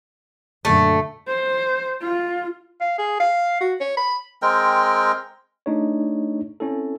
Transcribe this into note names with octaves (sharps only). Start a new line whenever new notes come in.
F#2 A#2 D3 A3
C5
F4
F5
G#4
F5
F#4
C#5
B5
G#3 C4 A#4 G5
A3 D4 D#4 F4 G#4 C#5
C4 C#4 E4 A4